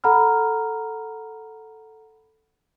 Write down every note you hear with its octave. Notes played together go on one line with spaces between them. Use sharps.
A4 F#5 A#5 B5 F6